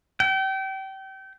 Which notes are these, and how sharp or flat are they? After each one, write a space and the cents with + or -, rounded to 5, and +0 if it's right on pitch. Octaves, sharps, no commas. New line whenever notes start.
G5 -30